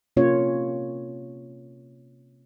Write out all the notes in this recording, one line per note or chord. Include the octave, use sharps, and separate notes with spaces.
C3 A#3 C#4 F4 C#5